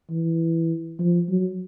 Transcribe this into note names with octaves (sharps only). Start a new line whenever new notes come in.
E3
F3
F#3